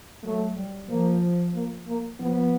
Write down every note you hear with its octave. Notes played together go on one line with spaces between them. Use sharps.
F#3 A3
G3
F3 A#3
A#3
A#3
F3 B3